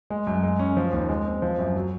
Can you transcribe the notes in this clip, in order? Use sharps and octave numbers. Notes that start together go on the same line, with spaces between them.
G#3
F#2
G#3
C#4
F3
D#2
G#3
C4
F3
F#2
F#3